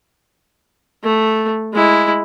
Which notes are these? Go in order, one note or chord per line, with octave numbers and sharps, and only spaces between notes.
A3
G#3 E4